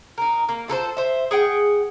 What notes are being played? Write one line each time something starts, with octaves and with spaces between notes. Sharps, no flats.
D#4 A#4
A#3
F4 A4 A#4 C5
C5 E5
G#4 F#5 G5